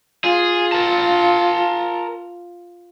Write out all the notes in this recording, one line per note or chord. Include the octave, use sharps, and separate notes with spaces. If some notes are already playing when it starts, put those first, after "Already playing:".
F4 G#4
A#4 A5